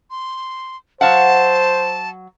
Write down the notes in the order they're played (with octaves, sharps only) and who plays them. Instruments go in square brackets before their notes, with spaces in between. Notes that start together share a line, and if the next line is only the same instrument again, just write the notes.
[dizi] C6
[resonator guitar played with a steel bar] F#3 F5 F#5 [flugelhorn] C5 [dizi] A5